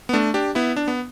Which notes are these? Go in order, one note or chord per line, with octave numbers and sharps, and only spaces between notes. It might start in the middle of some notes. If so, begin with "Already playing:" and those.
B3
A3 D4
D4 G4
B3 E4
D4
B3